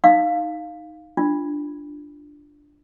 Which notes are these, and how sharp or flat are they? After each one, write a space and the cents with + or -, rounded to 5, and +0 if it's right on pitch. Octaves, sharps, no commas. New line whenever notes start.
D#4 +0 F5 +0
D4 +0 F4 -15